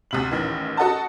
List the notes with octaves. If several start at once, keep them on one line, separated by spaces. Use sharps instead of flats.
D2 C3 F#7
A1 D#3 E3
F#4 A4 D#5 F#5 A5